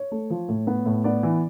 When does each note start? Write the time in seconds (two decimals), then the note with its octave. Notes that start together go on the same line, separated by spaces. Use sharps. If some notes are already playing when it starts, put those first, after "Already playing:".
Already playing: C#5
0.11 A3
0.30 F3
0.49 A2
0.67 B3
0.86 A2
1.04 B3 D5
1.23 E3